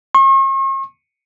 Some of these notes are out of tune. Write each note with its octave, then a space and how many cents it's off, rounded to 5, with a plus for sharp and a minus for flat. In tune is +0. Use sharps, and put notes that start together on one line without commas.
C#6 -45